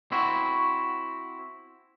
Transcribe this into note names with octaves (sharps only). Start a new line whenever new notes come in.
C4 E4 F#4